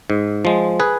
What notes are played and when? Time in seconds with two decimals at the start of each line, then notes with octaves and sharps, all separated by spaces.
0.10 G#2
0.45 F3 G#3
0.80 G#4 B4